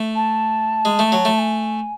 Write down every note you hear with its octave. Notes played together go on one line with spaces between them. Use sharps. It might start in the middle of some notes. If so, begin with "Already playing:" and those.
Already playing: A3
A5
G#3
A3
F#3
A3
G#5